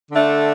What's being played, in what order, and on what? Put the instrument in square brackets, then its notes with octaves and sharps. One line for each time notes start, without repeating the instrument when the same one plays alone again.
[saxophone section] D3 A3 D4